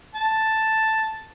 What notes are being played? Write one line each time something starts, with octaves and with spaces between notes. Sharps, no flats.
A5